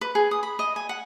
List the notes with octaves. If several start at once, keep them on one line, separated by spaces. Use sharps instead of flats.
B4
G#4
D#6
B5
D#5
G#5
F#5